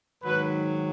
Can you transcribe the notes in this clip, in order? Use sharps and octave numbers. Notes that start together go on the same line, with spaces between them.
G#2 D#3 F#3 B4